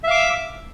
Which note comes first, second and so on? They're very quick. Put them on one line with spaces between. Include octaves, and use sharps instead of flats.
E5 F5 D6 E6